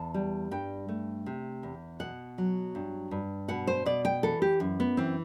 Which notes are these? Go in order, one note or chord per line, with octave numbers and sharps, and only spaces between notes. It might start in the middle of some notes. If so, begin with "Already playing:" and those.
Already playing: E2 A5
G3
G2 G5
A3
C3
E2
B2 F#5
F#3
G2
G2
B2 F#5
C5
B2 D5
G5
E3 A4
G4
F#2
B3
E3 C4